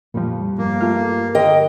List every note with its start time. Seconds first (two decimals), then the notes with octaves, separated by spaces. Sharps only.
0.14 F2 A#2 F3 G3
0.58 G1 A#3
0.81 A3 F4 F5
1.35 D3 A#4 D#5 G5